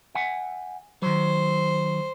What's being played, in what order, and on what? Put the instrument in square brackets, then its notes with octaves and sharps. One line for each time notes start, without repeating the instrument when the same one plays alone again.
[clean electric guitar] E5 F#5 G#5
[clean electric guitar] D#3 F#3 [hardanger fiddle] C5